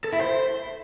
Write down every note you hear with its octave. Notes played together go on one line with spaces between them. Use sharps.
A4
E4
C5